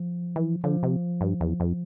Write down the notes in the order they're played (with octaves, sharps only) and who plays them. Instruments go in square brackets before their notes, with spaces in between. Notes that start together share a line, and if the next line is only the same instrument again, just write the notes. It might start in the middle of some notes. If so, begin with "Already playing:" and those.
Already playing: [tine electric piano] F3
[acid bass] E3
[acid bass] D3 [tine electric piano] F3
[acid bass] C3
G2
E2
F2